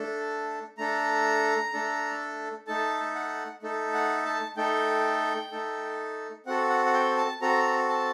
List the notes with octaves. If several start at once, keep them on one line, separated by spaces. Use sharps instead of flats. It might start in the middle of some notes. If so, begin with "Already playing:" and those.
Already playing: A3 D4 A4
A3 D4 A4 A#5
A3 D4 A4
A3 D#4 A4 A5
F#5
A3 D#4 A4
F#5
A5
A3 D#4 A4 G5
A3 D#4 A4
C4 F#4 A4 F#5
F#5
F#5
G5
A5
C4 F#4 A4 A#5
A5